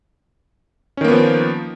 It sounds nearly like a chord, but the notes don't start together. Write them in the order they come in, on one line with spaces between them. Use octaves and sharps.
C#4 D#3 A#3 B3 F3